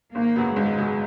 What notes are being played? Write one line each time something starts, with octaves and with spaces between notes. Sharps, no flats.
G#1 A#3
F#2 C#3 F#3 B3
G#1 G#3
F#2 C#3 F#3 B3